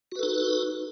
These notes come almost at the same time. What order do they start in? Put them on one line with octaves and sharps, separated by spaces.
F#4 B4 A4 D#4